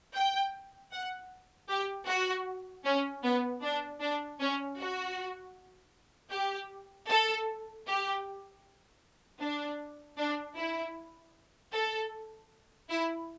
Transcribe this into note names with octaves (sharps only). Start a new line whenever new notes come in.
G5
F#5
G4
F#4
C#4
B3
D4
D4
C#4
F#4
G4
A4
G4
D4
D4
E4
A4
E4